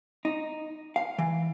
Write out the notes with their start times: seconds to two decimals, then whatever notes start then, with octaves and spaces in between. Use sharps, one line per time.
0.25 D#4
0.96 F5
1.18 E3